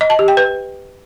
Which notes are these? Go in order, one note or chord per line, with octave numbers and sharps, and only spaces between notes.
D#5
A5
G4
G5
B4